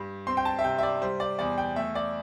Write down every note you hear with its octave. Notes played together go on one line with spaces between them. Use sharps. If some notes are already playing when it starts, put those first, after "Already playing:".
Already playing: G2 G3
C4 C6
G5
A5
E5
C3 G5
E5
D5
G3 C5
D5
E2 D5
G5
A3 E5
D5